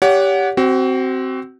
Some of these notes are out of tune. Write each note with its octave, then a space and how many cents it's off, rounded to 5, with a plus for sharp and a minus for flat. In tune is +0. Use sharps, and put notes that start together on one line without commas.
G4 +0 C#5 +35 F#5 -10
C4 +0 F#4 +30